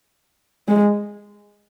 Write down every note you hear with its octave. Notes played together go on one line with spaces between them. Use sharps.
G#3